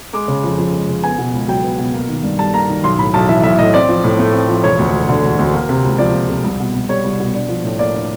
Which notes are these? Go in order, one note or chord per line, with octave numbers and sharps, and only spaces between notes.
G#3 D6
C#3
F2
F3
G#3
C#3
B3 G#5
B2
C#2
F#3 G5
B3
B2
A#3
D#3
G2
G3 A5
A#3 A#5
D#3
B1 C6
A2 B5
B1 A5
E3 E5
B1 E5
A2 D#5
C4 D5
F3
A2
A3
C4
F3
E1 C#5
D2
E1
D3
E1
D2
A#3
C3
C#2
F3 D5
A#3
C3
C2
B2
C2
G3 C#5
C2
B2
D4
F3
A2
A#3 D5
D4